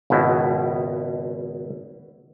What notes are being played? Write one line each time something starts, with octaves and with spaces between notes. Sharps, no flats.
G#1 C#2 B2 E4